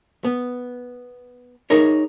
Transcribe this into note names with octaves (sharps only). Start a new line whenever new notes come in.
B3
D#4 G#4 A#4 C#5